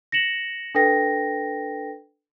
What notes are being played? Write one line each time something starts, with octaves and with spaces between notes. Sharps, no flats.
A#6 C#7 E7 F#7
D4 A4 B4 G5 A#6